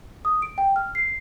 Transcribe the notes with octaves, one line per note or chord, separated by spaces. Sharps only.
D#6
D7
G5
F6
C7